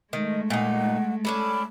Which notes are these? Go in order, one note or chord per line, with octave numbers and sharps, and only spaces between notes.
D#3 G#3 A3
A#2 D#4 F#5
C#4 D4 A4 B5